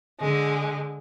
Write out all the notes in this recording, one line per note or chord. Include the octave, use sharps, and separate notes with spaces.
D3 G#3